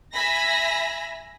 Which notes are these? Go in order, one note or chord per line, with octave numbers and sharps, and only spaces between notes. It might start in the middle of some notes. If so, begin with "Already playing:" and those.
E5 G#5 B5 A#6